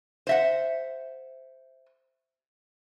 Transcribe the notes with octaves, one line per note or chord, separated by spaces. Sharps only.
C5 E5 F#5